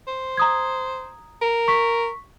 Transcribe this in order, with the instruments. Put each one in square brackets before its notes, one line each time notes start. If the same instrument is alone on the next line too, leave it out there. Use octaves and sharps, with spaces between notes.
[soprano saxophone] C5
[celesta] A#5 D#6 G#6
[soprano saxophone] A#4
[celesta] C#6 B6